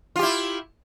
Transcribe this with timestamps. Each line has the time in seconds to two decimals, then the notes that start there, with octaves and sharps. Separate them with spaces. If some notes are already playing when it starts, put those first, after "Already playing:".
0.16 F4
0.19 G4
0.23 E4